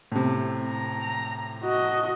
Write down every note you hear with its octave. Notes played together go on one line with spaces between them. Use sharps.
A2 C3
A#5
F#4 D#5